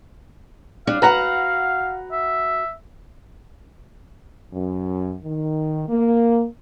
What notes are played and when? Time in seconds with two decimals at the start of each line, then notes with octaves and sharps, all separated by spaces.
0.87 G3 D4 F5
1.02 F#4 B4 F#5 A#5
2.12 E5
4.52 F#2
5.24 D#3
5.88 A#3